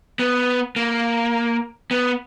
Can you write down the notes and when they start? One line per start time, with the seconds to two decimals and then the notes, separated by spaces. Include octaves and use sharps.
0.19 B3
0.76 A#3
1.91 B3